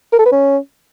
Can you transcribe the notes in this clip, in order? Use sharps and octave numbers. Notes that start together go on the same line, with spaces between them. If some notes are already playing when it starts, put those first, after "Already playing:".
A#4
A4
B4
C#4